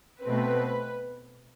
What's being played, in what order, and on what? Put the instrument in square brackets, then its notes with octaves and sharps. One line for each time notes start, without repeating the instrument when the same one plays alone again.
[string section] B2 A3 C4 B4